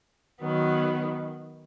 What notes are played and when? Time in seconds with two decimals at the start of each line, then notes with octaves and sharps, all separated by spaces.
0.41 D#3 F#3 B3